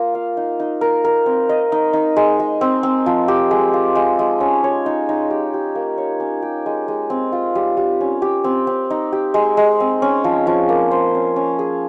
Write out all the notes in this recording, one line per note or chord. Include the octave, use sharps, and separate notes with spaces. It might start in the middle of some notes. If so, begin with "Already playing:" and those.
Already playing: A#3 F4 A#4
F5
D#4
D#4
A#4
A#4
C4
D#5
D#4
D#4
G#3
G#3
C4
C4
F3
G4
G#3
F4
G#3
G#3
C#4
C#5
D#4
D#4
G4
G4
A#3
C#5
C#4
G4
G#3
G#3
C4
F4
G3
G3
C#4
G4
C4
C4
D#4
G4
G#3
G#3
C4
C#4
F3
F3
A#3
C5
C#4
C#4
G#4